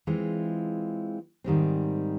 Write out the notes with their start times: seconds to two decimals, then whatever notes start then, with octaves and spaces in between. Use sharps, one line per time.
0.07 E3 G#3 C4 F4
1.44 G#2 D#3 G3 C4